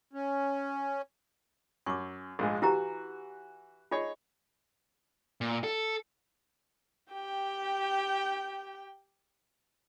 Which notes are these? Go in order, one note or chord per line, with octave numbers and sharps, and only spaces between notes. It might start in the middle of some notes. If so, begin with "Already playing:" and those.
C#4
F#2 C#6 D6
A#1 G#2 G#3
E3 E4 F#4 G4 A#5
D#4 F4 G#4 C#5
A#2
A4
G4 G5